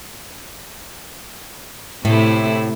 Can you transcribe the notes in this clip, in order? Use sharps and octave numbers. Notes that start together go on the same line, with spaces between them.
A2 C3 A3 E4